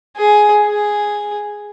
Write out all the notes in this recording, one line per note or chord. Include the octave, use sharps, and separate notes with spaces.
G#4
G#4